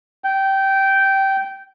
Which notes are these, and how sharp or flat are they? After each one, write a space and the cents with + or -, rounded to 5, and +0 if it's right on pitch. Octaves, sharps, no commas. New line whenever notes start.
G5 -15